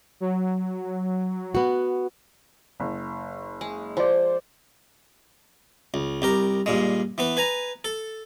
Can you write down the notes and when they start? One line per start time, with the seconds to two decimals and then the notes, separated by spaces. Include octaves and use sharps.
0.20 F#3
1.55 B3 F#4
2.80 F#1
3.61 G#3
3.97 F3 C5 D5
5.94 C#2
6.22 C2 G4 A#4
6.66 G2 A#2 G#3
7.18 E3 B3 B4
7.37 B4 G#5 A#5
7.84 A4